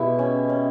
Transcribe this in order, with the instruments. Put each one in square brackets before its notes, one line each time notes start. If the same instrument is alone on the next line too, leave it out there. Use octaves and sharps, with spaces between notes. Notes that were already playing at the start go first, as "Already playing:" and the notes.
Already playing: [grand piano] B2 [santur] G#3 B3 E4 G4
[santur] C#4
C#4